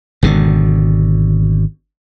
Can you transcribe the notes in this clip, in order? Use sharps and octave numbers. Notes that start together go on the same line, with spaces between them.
G#1 B2 D3